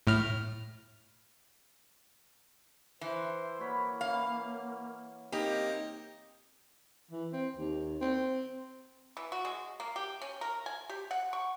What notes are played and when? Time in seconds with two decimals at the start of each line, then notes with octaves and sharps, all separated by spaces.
0.07 A2 F6
3.01 E3 C5
3.60 A#3 C#5 F#5 B5
4.01 E3 C#4 F5
5.32 A#3 C4 D#4 G4 D#5
7.11 E3
7.33 C4
7.57 D#2
8.01 C4
9.17 E3
9.32 F#4
9.45 G#3
9.80 A#3
9.96 G4
10.22 C#4
10.41 A#4
10.66 G#5
10.89 G4
11.11 F#5
11.33 C#6